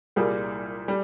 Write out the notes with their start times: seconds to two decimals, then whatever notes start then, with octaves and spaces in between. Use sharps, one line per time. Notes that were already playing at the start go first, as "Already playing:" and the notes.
0.16 C2 A#2 G3 A#3 G#4
0.88 G3